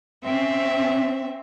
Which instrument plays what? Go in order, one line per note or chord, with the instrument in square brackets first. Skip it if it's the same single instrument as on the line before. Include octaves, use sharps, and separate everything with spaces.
[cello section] C4 C#4 [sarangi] E5